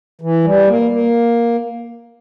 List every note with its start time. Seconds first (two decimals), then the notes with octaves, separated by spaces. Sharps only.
0.21 E3
0.44 G3
0.68 A#3
0.91 A#3